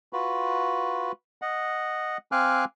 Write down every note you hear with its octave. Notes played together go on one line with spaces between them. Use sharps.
F4 F#4 B4
D#5 F#5
C4 F5 G#5 D6 F6 F#6